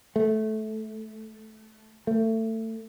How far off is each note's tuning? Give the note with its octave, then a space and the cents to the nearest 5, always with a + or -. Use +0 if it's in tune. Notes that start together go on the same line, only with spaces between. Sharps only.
A3 -15
A3 +25